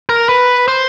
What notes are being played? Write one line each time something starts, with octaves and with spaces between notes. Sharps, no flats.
A#4
B4
C5